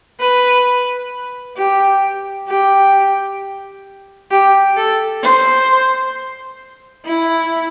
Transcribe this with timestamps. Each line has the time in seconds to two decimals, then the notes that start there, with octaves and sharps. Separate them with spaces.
0.20 B4
1.57 G4
2.49 G4
4.31 G4
4.77 A4
5.23 C5
7.05 E4